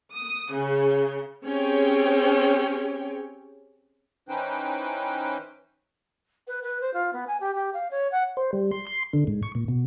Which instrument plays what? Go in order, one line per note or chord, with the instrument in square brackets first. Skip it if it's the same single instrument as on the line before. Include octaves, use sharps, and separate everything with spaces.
[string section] D#6
C#3
[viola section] C4 C#4 G4 G#4 C#5 G5
[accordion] E3 C#4 D#4 B4 C5 G5
[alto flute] B4
B4
C5
F4
B3
G#5
G4
G4
F5
C#5
F#5
[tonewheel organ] C5
G3
C6
C6
D3
G#2
C#6
A#2
B2